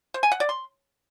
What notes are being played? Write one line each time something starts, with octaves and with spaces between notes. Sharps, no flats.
C5
G#5
F#5
D5
C6